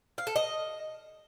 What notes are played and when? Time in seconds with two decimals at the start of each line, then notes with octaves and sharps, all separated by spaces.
0.18 F5
0.27 A4
0.36 D#5